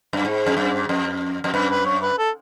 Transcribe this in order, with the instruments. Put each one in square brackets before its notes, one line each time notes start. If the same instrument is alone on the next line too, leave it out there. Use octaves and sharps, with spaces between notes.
[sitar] F#2
G#2
F2
F#2
F2
F2
[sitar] F#2 [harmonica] B4
[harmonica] B4
C#5
B4
A4